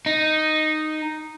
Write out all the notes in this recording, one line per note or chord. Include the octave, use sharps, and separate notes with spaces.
D#4